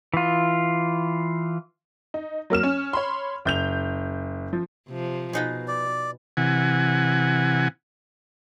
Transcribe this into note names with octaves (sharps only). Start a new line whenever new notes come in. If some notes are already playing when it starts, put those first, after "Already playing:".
E3 F4
D#4
F#3 A#3 F6 E7
C#4
C#5 B5 C6
F#1 G6 F7
F3
C3 F3
B2 B3 D#4 G#4
D5
C3 E3 F#5 G#5